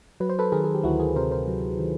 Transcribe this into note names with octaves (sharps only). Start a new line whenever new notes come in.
F#3 B4
C5
A4 B4
D#3 G#4 A#4
G#4
G4
D2 E4 F#4
F#4 G#4
C3 A#4 C5
A#4 C5
F#3
D#3